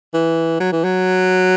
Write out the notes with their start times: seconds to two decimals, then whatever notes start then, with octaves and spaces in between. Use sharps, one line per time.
0.14 E3
0.60 F#3
0.72 E3
0.84 F#3